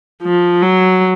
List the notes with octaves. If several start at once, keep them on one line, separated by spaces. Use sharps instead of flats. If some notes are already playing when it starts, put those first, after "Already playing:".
F3
F#3